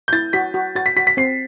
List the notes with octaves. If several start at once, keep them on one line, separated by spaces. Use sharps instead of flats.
G6
E4 A6
F#4 B6
F#4
F#4 A6
B6
F#4 B6
B6
C4 C7